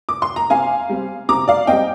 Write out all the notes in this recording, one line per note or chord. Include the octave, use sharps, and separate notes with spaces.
D6
C6
A#5
C3 F5 G#5
G3 C4
C3 A#5 D6
D5 F5
G3 C4 D#5 G5